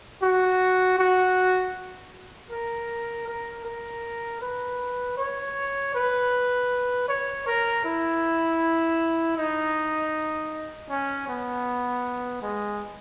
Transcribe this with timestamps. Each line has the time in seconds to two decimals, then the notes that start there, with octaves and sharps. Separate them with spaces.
0.22 F#4
0.99 F#4
2.51 A#4
3.28 A#4
3.65 A#4
4.42 B4
5.18 C#5
5.95 B4
7.09 C#5
7.47 A#4
7.84 E4
9.37 D#4
10.90 C#4
11.28 B3
12.42 G#3